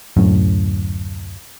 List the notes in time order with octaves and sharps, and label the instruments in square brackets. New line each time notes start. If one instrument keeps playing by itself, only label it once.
[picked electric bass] D1 F#2 A2